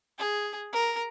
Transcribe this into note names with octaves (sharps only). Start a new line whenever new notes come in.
G#4
A#4